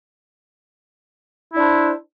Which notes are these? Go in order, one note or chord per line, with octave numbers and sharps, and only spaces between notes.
D4 E4 C5